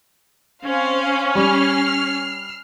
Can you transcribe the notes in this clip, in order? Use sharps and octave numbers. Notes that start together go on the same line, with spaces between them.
C4 C#4 C5 F5
G3 F6 C7